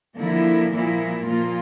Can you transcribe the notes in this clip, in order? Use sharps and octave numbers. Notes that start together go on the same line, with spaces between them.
D3 F3 A#3 E4
A#2 F3 A#3 E4
A#2 F3 A#3 F4